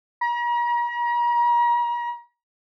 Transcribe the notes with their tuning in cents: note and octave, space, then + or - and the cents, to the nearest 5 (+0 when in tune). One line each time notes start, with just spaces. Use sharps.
A#5 +40